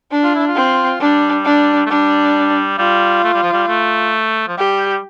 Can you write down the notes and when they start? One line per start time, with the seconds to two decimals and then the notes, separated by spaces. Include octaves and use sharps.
0.11 D4
0.23 F4
0.35 E4
0.47 F4
0.56 C4
1.01 G3 D4
1.45 D4
1.86 A3
1.90 G3 D4
2.78 G3 F4
3.24 A3
3.34 G3
3.43 F3
3.53 G3
3.68 A3
4.48 F3
4.58 G3 G4